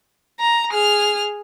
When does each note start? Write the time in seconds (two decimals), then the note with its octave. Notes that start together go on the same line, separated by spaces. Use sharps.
0.40 A#5
0.70 G#4 F6